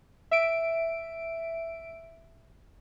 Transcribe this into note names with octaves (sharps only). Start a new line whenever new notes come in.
E5 D7